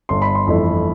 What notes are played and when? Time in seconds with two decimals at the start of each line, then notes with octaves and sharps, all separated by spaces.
0.09 G1 C6
0.22 B5
0.35 C6
0.47 F2 E3 A3 E4